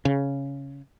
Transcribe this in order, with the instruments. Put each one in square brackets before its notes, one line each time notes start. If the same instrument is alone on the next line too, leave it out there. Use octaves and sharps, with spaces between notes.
[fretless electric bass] C#3